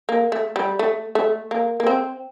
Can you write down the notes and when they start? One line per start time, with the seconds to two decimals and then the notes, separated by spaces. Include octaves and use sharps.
0.09 A#3
0.32 A3
0.56 G3
0.79 A3
1.15 A3
1.51 A#3
1.80 A#3
1.87 C4